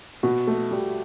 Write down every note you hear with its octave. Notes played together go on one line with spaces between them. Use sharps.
B2 F#4
A3
G3 G4